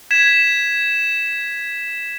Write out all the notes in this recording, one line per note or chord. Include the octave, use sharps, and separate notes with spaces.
G#6 B6 E7